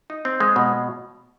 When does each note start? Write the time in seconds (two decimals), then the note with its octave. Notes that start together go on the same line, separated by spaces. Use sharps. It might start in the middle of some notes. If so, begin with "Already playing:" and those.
0.10 D#4
0.25 C4
0.40 G#3
0.56 B2